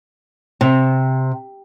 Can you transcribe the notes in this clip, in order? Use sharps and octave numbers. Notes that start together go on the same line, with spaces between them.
C3